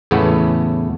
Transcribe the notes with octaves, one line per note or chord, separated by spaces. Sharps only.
E2 A2 C#3 A3 B3